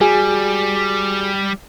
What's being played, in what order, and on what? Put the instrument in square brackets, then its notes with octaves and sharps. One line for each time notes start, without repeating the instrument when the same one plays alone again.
[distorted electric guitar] G3 [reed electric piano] F#4 G#4 G#5